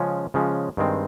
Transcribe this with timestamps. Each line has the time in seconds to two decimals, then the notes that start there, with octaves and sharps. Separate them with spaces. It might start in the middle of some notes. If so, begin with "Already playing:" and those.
Already playing: C#3 F3 G#3 C#4
0.34 C#3 F3 G#3 C#4
0.77 G2 D#3 G#3 C4